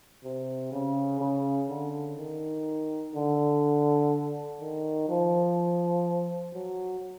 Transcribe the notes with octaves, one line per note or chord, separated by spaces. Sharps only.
C3
C#3
C#3
D3
D#3
D3
D#3
F3
F#3